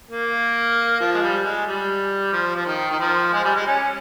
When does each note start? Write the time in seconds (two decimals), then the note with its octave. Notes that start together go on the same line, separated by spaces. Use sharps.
0.10 A#3
1.00 F3
1.14 G#3
1.22 G3
1.44 G#3
1.66 G3
2.32 F3
2.56 F3
2.66 D#3
2.91 D#3
2.99 F3
3.33 G#3
3.44 G3
3.55 G#3
3.66 C#4